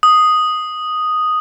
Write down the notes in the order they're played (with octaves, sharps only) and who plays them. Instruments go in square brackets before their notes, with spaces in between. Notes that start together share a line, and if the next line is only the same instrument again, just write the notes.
[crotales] D#6